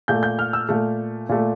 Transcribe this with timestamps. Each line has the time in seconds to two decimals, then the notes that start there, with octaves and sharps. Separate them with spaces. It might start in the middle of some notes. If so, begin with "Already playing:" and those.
0.08 A#2 A3 G6
0.23 G6
0.39 F6
0.53 E6
0.69 A#2 A3
1.29 A#2 A3